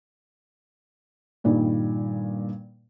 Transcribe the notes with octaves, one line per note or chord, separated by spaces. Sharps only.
G2 A#2 D#3 G3